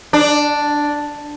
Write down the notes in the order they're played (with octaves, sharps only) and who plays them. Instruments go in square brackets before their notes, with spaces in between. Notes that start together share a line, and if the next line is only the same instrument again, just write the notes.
[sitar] D4